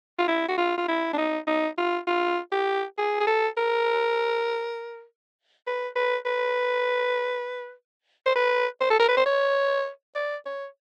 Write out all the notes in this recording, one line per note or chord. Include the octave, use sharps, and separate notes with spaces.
F4
E4
F#4
F4
F4
E4
D4
D#4
D#4
F4
F4
G4
G#4
G#4
A4
A#4
B4
B4
B4
C5
B4
C5
A4
A#4
B4
C5
C#5
D5
C#5